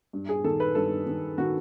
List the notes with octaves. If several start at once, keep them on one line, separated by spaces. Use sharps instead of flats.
G2
G#4
D#3 A4
B4
G2 A4
D#3
D#3 F#4